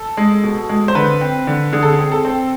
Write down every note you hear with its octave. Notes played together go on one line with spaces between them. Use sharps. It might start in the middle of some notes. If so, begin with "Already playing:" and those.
Already playing: A4
G#3
B2
G#3
C5
D3 B4
C4
D3
D3 G#4
A4
G#4
C4
A4
C4